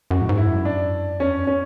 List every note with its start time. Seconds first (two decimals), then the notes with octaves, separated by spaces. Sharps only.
0.11 F#2 F#4
0.21 A2
0.29 G#2
0.37 E4
0.47 F#2
0.65 D4
1.20 E2 C#4
1.37 F#2
1.47 C#4